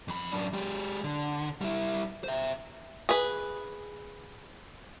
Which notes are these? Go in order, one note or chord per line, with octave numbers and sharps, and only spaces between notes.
F2 B5
F#2 D4
G#3 G4
D3
G3 E4
C5 E5
G#4 B4